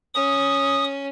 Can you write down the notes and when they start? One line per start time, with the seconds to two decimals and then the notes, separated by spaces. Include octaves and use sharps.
0.15 C#4 D#6